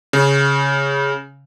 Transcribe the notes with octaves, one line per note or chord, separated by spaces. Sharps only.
C#3